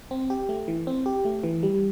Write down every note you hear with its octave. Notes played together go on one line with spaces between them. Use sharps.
C4
G4
A3
E3
C4
G4
A3
E3
G3